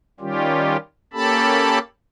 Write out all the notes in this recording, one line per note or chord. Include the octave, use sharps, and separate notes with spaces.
D#3 G3 C#4 F4 G4
A#3 C#4 G4 A4 A5 B5